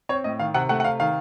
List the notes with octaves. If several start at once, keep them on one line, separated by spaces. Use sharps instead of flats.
C4 C#5
A2 D#5
D#3 F5
C3 F#5
A3 F#5
F#5
C3 F5
D#3 F5